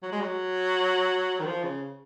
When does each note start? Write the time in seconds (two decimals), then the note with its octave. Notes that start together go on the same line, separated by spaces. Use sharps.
0.03 F#3
0.12 G#3
0.21 F#3
1.40 D#3
1.45 F3
1.63 C#3